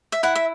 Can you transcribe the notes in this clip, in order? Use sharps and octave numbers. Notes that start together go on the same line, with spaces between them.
E5
E4 F#5
E5